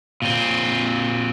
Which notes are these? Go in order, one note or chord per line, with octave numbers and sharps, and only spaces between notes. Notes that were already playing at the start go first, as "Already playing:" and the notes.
A#2 C4